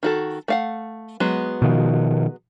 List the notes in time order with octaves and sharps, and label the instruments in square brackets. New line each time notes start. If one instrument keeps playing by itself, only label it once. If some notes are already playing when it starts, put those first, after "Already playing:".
[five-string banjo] D#3 F#4 A4
A3 F5 F#5
F#3 G#3 B3
[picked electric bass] B2 D#3 F3